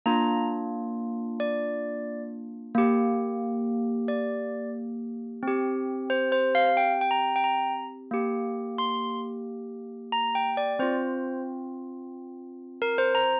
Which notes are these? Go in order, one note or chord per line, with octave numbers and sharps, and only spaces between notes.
A#3 D4 F4 A#5
D5
A#3 G4
D5
C4 G4
C5
C5
F5
G5
G5
A#5
G5
A#5
A#3 G4
C6
A#5
G5
D5
C4 F4 C5
A#4
C5
A#5